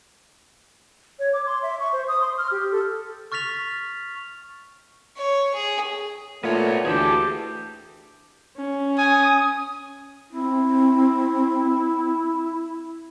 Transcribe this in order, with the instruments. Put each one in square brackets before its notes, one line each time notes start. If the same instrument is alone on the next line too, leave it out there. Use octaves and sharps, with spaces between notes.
[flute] C#5
D6
C6
E5
C#6
C5
D#6
C6
F6
G4
A4
[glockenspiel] C#6 F6 A6 B6 F7
[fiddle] C#5
G#4
[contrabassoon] A#2 [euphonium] A3 [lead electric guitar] B3 C#5
[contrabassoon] D2 [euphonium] E3 [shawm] G4 [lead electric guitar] G#4 A5
[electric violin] C#4
[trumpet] G#5 [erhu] D#6
[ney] C4 [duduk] E4